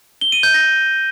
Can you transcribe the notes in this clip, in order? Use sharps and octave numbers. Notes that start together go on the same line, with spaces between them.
G7
D#7
G6
A#6